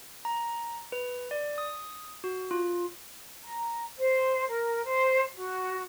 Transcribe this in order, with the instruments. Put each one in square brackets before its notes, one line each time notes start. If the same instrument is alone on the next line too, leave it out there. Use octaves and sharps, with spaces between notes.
[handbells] A#5
B4
D5
D#6
F#4
F4
[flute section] A#5
C5
A#4
C5
F#4